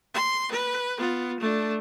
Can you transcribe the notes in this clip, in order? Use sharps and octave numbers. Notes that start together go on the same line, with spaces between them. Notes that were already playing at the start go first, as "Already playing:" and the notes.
C6
B4
B3 F4
A3 D4